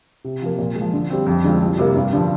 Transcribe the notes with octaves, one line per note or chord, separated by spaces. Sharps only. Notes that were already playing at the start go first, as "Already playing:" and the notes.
C3
F3 A#3
A#2
G#3
F3
D3
G3 C4
F2
D3 G#3 C4 F4
C2
C3 G3 A#3
G2
D3 F3